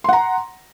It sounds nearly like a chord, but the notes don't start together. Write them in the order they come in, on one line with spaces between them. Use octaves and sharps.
C6 F#5 A#5